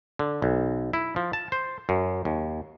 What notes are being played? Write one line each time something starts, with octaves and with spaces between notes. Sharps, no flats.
D3
B1
E4
F3
A5
C5
F#2
D#2